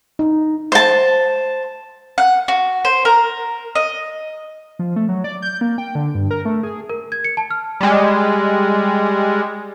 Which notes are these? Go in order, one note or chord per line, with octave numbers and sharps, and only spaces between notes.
D#4
C5 A5
F#5
F#4
C5
A#4
D#5
F3
A3
F#3
D5
G6
A#3
G5
D3
G2
A#4
A3
G#4
A#4
G#6
C#7
A5
F6
G3 G#3